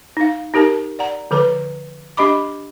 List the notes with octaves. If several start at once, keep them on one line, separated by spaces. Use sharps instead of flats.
D#4 F5
D#4 G4 A#4 A5
D5 F#5 A#5
D3 F3 A4 B4 A#5
D4 G4 D#5 B5 D6